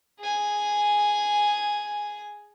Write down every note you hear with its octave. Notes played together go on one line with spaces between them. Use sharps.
G#4 G#5